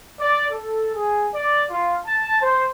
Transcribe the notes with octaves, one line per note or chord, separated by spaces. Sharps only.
D5
A4
G#4
D5
F4
A5
C5